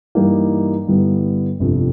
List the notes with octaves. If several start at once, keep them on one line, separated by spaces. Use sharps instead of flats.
G2 E3 G3 A#3 D#4
G2 D3 G3 B3 E4
G1 F2 C3